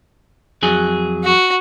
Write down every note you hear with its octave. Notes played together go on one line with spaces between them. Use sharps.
F2 F#3 G#4
F#4